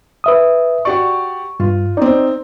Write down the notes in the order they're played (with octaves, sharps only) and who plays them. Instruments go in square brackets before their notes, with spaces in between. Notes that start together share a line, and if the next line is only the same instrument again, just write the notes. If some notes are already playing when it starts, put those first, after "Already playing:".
[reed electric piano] B4 E5 D#6
[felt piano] F#4 G4 D5 [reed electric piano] C#6
[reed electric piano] G2 [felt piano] F4
[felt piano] C4 D#4 [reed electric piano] D5